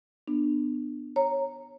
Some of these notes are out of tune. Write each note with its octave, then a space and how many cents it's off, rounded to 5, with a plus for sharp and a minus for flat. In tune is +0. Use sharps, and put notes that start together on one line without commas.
B3 +0 D4 +25
C#5 -15 A#5 -5